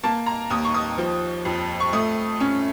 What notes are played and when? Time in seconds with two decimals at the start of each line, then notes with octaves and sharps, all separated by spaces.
0.03 A#3 A5
0.26 A#5
0.50 D#2 D#6
0.64 C#6
0.74 D#6
0.98 F3
1.45 F2
1.80 C#6
1.93 A3 D#6
2.40 C#4